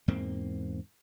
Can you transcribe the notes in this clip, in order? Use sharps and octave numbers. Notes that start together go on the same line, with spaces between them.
E2 G#2 A#3 C4